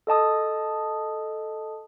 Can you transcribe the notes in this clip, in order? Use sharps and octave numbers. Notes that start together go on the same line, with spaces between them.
A4 D#5 A5 D#6